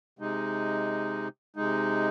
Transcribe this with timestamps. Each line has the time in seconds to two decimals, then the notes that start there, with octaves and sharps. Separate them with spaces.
0.19 C3 G#3 D#4
1.56 C3 G#3 D#4